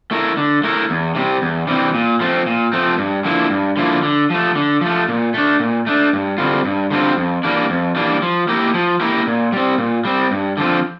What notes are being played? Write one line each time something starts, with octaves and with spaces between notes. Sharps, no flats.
A3 E4 A#4
D3
A3 E4 A#4
E2
C3 E3 G3 C4
E2
C3 E3 G3 C4
A#2
F3 A3 C4
A#2
F3 A3 C4
G2
D3 F3 A#3 E4
G2
D3 F3 A#3 E4
D3
F3 A3
D3
F3 A3
A#2
A3 D4
A#2
A3 D4
G2
D3 G3 C4 F4
G2
D3 G3 C4 F4
F2
E3 G3 A#3 D4
F2
E3 G3 A#3 D4
F3
A#3 E4 G4 A#4
F3
A#3 E4 G4 A#4
A#2
G3 C4
A#2
G3 C4
G2
D3 F3 C4